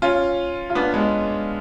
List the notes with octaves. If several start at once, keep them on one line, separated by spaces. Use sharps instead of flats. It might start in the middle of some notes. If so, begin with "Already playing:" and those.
C#4 F4
F4
B3 D4
G#3 B3